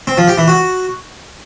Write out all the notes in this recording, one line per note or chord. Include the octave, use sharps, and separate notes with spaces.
C4
F3
G4
E3
F#4